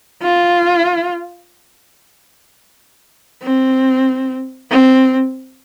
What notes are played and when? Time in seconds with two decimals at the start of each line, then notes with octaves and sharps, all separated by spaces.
0.22 F4
3.43 C4
4.71 C4